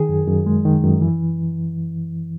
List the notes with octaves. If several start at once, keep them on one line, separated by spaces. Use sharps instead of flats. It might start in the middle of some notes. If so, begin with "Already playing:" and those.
Already playing: D#3 G#4
F#2
F#2
G#3
D#3
F#2
E3